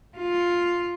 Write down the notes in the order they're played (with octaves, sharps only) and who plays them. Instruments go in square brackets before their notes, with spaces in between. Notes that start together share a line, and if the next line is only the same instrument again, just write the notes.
[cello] F4